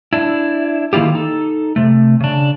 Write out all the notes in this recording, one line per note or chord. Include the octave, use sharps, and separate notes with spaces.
D4 E4
D#3 A#3 E4 F4 G4
D#4 A4
C3 A3
C#3 D4